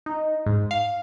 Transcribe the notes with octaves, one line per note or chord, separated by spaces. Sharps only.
D#4
G#2
F5